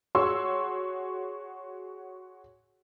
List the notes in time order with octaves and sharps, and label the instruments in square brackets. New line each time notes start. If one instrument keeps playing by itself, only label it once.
[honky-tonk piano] F#4 G#4 C#5 C6 C#6 E6